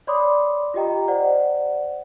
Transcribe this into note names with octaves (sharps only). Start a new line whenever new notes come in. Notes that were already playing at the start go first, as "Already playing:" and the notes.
C#5 D5 B5 C6 D6 D#6
F4 G4 D#5 G5 A#5
C5 D5 F#5